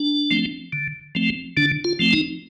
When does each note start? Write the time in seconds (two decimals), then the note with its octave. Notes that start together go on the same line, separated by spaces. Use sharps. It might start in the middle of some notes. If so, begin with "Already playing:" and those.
Already playing: D4
0.31 F3 A3 C4
0.73 D3
1.15 F3 A3 C4
1.57 D3 D4
1.84 F4
1.99 F3 A3 C4
2.13 D#4